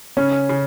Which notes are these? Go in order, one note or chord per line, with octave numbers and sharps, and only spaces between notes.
C#3 C#4
C#3